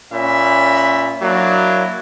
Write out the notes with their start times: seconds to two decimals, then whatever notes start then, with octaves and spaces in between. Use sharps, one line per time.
0.12 A#2 C#4 E5 B5
1.22 F#3 A#3 D4 E4